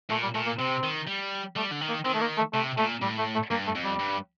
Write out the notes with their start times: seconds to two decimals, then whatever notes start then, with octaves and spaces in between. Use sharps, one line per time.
0.10 A#2 A3
0.23 G3
0.35 A#2 A3
0.46 A#3
0.59 C3 C4
0.84 D#3
1.08 G3
1.56 G3 A3
1.72 D3
1.81 D#3
1.89 A#3
2.05 D#3 C4
2.14 A3
2.21 A#3
2.38 A3
2.54 C3 A3
2.78 A#2 A3
3.02 A2 G3
3.19 A3
3.35 A3
3.51 G2 A#3
3.67 A3
3.75 F2
3.84 G3
3.99 G2